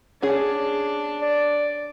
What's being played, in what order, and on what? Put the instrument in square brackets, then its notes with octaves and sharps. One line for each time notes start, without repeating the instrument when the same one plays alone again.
[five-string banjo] C#4 G#4 [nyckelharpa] D4
[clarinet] D5